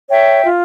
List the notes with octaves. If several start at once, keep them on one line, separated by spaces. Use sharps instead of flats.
C#5 E5 G5
F4